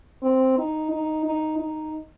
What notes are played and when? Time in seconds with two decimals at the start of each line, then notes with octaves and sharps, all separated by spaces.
0.23 C4
0.58 D#4
0.91 D#4
1.26 D#4
1.60 D#4